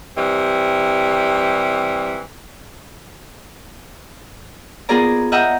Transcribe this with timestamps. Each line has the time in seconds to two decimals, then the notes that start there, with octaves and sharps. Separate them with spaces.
0.17 C3 E3 G3
4.89 B3 F4 G#4 A#4 D5 A#5
5.32 D#5 E5 F#5 G5 A#5 F6